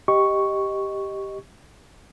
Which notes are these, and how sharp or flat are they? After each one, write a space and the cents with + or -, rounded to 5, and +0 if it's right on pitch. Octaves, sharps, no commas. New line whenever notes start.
G4 +0 D#5 +0 C#6 +0